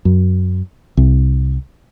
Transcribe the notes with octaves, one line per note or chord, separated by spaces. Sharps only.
F#2
C2